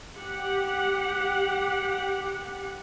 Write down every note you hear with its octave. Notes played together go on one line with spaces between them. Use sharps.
G4 F#5